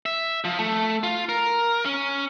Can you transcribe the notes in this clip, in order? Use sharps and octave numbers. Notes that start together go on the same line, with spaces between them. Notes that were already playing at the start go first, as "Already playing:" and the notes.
E5
F3
A3
F4
A#4
C#4